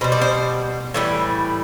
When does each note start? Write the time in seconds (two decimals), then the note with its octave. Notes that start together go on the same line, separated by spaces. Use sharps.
0.01 B2 G3 C5
0.12 D5
0.21 C5
0.94 A2 E3 G3